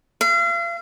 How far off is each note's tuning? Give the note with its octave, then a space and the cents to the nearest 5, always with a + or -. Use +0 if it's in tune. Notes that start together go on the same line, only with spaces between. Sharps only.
F5 -40